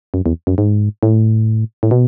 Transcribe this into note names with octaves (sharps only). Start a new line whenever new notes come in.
F#2
E2
F#2
G#2
A2
A2
B2